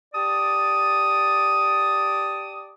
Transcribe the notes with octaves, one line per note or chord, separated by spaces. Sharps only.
G4 D5 A5 D6 D#6